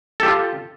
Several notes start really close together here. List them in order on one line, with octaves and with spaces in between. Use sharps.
A4 G4 F4